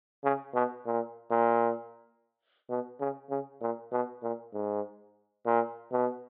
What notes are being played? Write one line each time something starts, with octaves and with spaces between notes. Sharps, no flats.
C#3
B2
A#2
A#2
B2
C#3
C#3
A#2
B2
A#2
G#2
A#2
B2